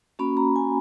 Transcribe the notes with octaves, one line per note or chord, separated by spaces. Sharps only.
A#3 C#4 F#4 B5
A#5
G#5